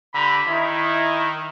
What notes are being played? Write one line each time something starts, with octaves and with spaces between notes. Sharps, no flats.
D3 G4 A#5 B5
D#3 D#4 E4